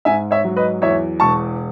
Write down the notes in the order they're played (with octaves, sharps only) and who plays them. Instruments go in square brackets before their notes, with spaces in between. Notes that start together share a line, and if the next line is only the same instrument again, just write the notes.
[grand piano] G#2 E5 G#5
C#5 E5
F#3
B4 D#5
E2 C#5 E5
E1 A5 C#6